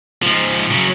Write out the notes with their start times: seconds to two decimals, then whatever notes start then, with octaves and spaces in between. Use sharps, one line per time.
0.23 G#2 F3
0.70 C#3 F#3